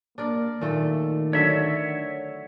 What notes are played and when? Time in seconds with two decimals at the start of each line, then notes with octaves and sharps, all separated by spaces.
0.18 A#3 D4 A#4 D5
0.61 A#2 D#3 A3 A4
1.33 D3 F#3 A4 C#5 E5